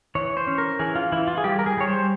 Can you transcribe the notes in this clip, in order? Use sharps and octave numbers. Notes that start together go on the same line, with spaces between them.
E3 C#5
C5
C#4
A#4
E3 G#4
F4
E3 E4
F4
G#4
G3 G4
A#4
G#4
G3 C#5
C5